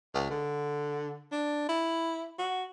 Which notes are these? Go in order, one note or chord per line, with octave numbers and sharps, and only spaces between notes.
C#2
D3
D4
E4
F#4